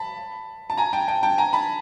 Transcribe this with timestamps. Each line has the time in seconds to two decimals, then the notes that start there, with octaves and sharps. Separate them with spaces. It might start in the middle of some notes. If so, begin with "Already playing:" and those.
Already playing: A5 B5
0.70 A5
0.77 G#5 A#5
0.93 G5 A5
1.08 G5 A5
1.23 G5 A5
1.38 G#5 A#5
1.53 A5 B5